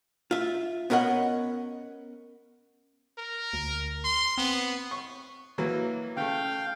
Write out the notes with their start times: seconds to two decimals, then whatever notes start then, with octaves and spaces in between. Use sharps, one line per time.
0.31 F4 E5
0.90 B3 C#4 A#4 D#5 F#5
3.18 A#4
3.53 D2
4.04 C6
4.38 B3 C4
4.91 C#6
5.58 E3 F#3 A#3
6.17 C#3 A3 F5 G5